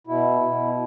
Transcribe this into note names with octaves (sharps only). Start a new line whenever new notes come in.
B2 E4
B2